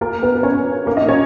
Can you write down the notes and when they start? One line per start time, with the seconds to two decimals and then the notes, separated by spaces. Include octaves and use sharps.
0.01 A#3 A#4
0.23 B3 B4
0.35 B4
0.43 C#4 C#5
0.86 A#3 A#4
0.97 D#4 D#5
1.08 C#4 C#5